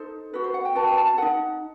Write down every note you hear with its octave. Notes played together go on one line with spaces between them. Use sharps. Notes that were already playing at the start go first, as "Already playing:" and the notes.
Already playing: D#4 A4 C5
F#4 A4 B4
C5
F#5
G5
F#4 B4 A5
G5
A5
A5
D#4 A4 F#5